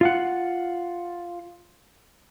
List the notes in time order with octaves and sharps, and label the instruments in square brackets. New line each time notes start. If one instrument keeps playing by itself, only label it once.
[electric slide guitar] F4 F5 F#5